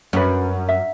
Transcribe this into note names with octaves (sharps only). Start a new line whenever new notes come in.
F#2 C#4 B4
E5